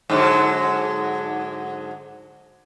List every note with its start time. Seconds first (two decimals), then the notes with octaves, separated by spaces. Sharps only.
0.10 G#2 D3 F#3